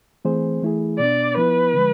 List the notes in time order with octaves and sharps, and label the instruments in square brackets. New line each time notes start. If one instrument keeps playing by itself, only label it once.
[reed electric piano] E3 A3 C4 G#4 C5
E3 A3 E4 G#4
[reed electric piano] B2 B3 D4 [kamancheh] D5
[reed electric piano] F3 B3 E4 [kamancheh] B4
[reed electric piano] D3 F3 G#3